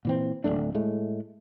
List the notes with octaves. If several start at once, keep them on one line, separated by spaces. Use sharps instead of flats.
A#2 E3 C4
D1 D#2 A3 D4
A2 G#3 A3